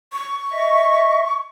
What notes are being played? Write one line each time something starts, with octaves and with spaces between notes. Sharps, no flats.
C#6
D#5 E5